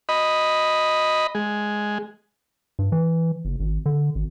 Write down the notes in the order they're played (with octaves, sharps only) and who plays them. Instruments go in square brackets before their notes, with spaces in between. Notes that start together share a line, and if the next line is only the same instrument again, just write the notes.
[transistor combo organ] D#5 B5
G#3
[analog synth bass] G2
E3
F#1
G#1
D3
G#1